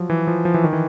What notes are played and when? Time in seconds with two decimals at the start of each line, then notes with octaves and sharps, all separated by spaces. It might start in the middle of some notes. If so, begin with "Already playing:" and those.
Already playing: F3 F#3
0.10 E3
0.27 F3
0.45 F3
0.54 E3
0.64 D#3
0.73 E3